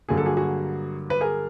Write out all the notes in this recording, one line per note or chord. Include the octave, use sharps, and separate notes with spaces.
G2 D3 F#3 A#3 G#4
A4
F#4 G#4
F#4 G#4
B4
G#4 A#4